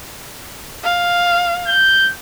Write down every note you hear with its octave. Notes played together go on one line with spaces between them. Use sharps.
F5
G6